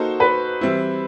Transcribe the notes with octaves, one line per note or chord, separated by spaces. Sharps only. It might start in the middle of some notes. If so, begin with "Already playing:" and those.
Already playing: A#3 D#4 F#4 A4 C5
B4
E3 G3 C4 E4